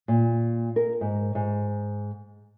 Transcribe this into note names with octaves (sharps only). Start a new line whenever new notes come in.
A#2
A#4
G#2
G#2